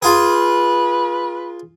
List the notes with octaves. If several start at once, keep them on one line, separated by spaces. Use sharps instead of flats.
F4 G#4 B4